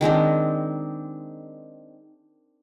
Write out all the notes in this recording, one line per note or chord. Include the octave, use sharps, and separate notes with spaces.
D#3 G#3 C4 D4